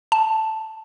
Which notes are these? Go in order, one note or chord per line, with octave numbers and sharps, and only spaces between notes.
A5